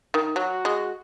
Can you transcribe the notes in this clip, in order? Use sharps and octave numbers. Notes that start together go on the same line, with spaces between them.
D#3
F#3 F#4
G#3